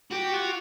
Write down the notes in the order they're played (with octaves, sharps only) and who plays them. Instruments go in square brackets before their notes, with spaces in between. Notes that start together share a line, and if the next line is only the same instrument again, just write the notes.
[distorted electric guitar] F#4 [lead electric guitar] G4
[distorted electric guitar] F4 [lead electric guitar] F#4